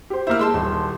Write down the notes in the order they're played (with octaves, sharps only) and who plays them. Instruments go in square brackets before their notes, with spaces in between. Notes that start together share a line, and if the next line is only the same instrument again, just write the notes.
[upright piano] G4 C5
[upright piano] A#3 E4 [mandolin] C5 F6
[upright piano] G#3 [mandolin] A5 C6 E6
[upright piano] D#1